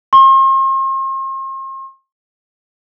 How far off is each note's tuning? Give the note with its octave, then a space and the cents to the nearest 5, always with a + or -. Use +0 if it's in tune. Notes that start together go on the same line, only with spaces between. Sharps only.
C6 +40